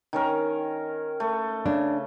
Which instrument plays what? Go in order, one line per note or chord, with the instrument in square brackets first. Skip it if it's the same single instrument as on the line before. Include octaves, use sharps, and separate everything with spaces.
[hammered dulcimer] D#3 C#4 A#4
A3
[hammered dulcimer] C#3 [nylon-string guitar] D4